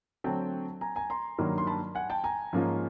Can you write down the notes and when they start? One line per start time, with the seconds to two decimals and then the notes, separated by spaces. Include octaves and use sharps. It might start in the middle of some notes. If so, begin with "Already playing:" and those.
0.24 D3 F#3 A3 C4 G5 A5
0.81 G#5 A#5
0.96 G#5 A#5
1.10 A#5 C6
1.38 G2 D#3 F#3 A#3
1.58 C6
1.67 A5 B5
1.95 F#5 G#5
2.10 G5 A5
2.24 G#5 A#5
2.53 G#2 F3 A#3 C#4 F4